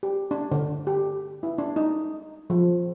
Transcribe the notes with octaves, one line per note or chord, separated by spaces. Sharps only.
G4
D4
D3
G4
E4
D4
D#4
F3